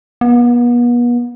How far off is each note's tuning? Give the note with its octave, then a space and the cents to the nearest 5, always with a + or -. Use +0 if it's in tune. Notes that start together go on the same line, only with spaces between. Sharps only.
B3 -40